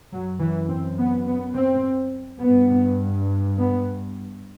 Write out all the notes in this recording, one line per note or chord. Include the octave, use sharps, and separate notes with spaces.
F#2 F#3
E3
C4
B3
B3
C4
G2 B3
B3